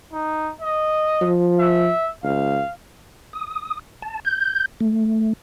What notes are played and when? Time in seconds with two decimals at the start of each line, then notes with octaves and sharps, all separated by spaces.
0.13 D#4
0.61 D#5
1.21 F3
1.59 E5
2.24 C#2 F5
3.33 D#6
4.02 A5
4.25 G6
4.80 A3